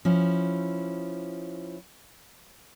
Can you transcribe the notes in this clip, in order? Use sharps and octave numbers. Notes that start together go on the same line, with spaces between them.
F3 C#4 E4